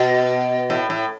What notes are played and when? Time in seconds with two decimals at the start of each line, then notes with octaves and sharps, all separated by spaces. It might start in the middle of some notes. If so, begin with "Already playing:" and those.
Already playing: B2
0.70 A2
0.90 A2